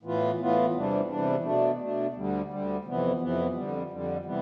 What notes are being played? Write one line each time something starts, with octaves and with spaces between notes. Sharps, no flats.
A2 E3 B3 F4
A2 E3 B3 F4
E2 C3 E3 G3 D4
E2 C3 E3 G3 D4
B2 A3 D4
B2 A3 D4
D2 D3 G3
D2 D3 G3
F2 C3 E3 B3
F2 C3 E3 B3
F2 D3 G3
F2 D3 G3
C3 E3 G3 B3